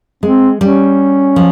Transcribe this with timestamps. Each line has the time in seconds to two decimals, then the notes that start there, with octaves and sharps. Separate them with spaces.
0.23 G#3 C4
0.60 G3 C#4
1.36 F3